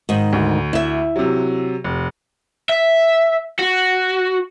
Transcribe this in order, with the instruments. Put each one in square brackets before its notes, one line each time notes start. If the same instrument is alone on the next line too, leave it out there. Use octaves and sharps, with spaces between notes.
[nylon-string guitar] G#2 D#3
[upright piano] D2
[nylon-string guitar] E4 E5
[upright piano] C3 F#3
F1
[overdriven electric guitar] E5
F#4